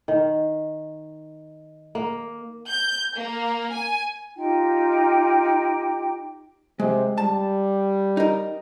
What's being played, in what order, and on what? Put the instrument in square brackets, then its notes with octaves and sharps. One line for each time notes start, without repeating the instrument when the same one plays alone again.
[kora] D#3
A#3
[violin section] G6
A#3
G#5
[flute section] D#4 F4 G4 G5
[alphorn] C3 [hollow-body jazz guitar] G#3
[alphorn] G3 [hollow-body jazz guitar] A5
[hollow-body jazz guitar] D#4 A#4